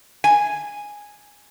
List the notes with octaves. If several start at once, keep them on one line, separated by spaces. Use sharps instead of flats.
G#5